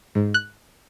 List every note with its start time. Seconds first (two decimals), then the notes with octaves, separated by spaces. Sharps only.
0.15 G#2
0.34 F#6